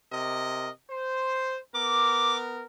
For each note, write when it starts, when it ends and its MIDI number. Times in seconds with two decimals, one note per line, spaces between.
0.11 0.68 48
0.11 0.68 70
0.11 0.68 75
0.89 1.57 72
1.74 2.63 59
1.74 2.63 70
1.74 2.37 86